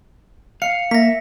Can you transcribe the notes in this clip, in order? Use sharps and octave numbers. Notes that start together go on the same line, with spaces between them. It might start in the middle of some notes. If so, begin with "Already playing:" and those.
F5 C#7
A#3 E5 A#6 B6